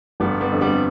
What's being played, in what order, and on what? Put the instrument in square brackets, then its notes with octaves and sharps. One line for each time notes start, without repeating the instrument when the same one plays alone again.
[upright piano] G1 [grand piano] G3 B3
[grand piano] G3 B3
[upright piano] F2 D3
[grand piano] G3 B3